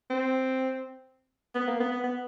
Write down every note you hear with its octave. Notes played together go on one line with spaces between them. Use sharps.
C4
B3
A#3
B3
B3
B3